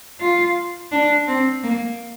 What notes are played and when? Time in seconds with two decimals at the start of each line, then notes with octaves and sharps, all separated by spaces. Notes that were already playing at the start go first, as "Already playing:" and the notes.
0.20 F4
0.92 D4
1.27 C4
1.63 A#3